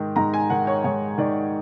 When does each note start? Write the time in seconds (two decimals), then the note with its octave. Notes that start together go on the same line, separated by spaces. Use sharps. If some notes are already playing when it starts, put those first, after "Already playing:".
Already playing: G#2 D#3
0.16 G#2 A#5
0.34 G#5
0.50 D#3 F#5
0.67 C#5
0.84 G#2 C#5
1.18 D#3 D5